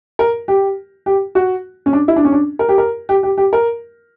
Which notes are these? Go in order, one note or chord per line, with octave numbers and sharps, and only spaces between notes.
A#4
G4
G4
F#4
C#4
D4
E4
D4
C#4
D4
A#4
G4
A#4
G4
G4
G4
A#4